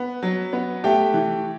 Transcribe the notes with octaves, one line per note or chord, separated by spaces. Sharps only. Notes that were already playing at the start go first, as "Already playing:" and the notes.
Already playing: B3
F#3
B3
A3 G4 G5
E3